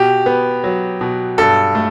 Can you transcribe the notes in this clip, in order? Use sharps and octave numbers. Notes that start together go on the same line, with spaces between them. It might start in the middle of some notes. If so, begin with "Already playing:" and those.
Already playing: B2 G4
B3
F#3
B2
G2 A4
A3